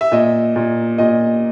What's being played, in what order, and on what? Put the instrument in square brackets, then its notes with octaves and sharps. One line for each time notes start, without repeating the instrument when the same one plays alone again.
[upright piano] E5
A#2 D#5
A#2
A#2 D#5